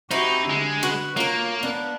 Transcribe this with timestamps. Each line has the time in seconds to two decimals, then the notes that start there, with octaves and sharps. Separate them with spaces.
0.11 C4 D#4 E4 F#4 G4
0.50 D3 G#3
0.83 F#4 B4
1.17 A#3 F4 A#4 C#5
1.63 B3 D4